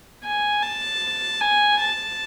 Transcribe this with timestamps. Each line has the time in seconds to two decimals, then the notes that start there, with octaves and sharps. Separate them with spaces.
0.24 G#5
0.63 A5
1.41 G#5
1.80 A5